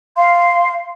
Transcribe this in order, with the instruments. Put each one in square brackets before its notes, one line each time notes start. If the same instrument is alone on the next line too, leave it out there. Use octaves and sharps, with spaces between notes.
[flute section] F5 C6